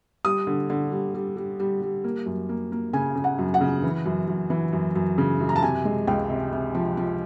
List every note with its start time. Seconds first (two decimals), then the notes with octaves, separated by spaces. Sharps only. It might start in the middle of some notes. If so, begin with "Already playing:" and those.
0.25 G3 D#6
0.47 D3
0.70 D3
0.92 G3
1.15 G3
1.37 G3
1.60 G3
1.82 G3
2.04 A#3
2.26 F#2
2.49 A#3
2.72 A#3
2.93 C#3 G#5
3.16 C#3
3.24 F#5
3.39 F#2
3.54 F#5
3.61 C#3
3.83 E3
4.06 F#2
4.28 F#2
4.50 E3
4.73 F#2
4.96 F#2
5.18 C#3
5.40 F#2
5.49 A#5
5.56 A5
5.62 C3 G#5
5.85 G#3
6.07 C#2 G5
6.30 C3
6.53 C3
6.75 F3
6.97 F3